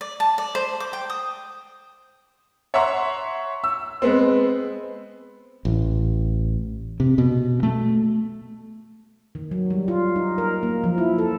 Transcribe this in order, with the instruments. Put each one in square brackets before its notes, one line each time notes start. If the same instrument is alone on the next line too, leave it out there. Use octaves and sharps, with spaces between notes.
[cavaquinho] D5
A5
D5
C5
D6
G5
D#6
[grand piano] C#5 E5 F#5 A#5 C6 C#6
E6
G#3 B3 C4
[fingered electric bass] A1
C3
B2
A3
[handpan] D#3
F#3
G3
F4
D#4
A#4
A#3
F3
E4
A4